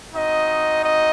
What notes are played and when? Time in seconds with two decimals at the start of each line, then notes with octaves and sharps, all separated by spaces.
0.14 C4 D#4 F#4 D#5
0.82 D#5